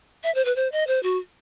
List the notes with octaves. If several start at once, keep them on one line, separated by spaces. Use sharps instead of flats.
E5
C5
B4
C5
D#5
C5
F#4